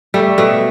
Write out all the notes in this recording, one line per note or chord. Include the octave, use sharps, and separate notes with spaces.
G3 A3
B2 A3